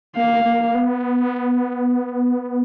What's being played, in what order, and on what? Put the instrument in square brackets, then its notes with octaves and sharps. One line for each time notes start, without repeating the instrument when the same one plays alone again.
[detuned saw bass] A#3 [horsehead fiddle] F5
[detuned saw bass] A#3
B3